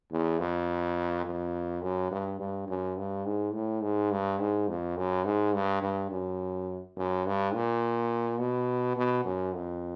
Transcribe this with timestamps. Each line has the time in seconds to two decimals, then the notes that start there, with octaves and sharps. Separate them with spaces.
0.11 E2
0.39 F2
1.26 F2
1.82 F#2
2.11 G2
2.40 G2
2.68 F#2
2.97 G2
3.26 G#2
3.54 A2
3.83 G#2
4.11 G2
4.40 G#2
4.68 F2
4.97 F#2
5.25 G#2
5.55 G2
5.83 G2
6.11 F#2
6.97 F#2
7.26 G2
7.54 A#2
8.39 B2
8.97 B2
9.25 F#2
9.55 F2